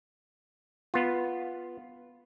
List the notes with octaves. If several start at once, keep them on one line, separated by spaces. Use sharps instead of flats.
B3 F4